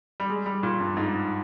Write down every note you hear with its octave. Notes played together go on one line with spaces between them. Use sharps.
G3
G#3
G3
A#2
G2
G#2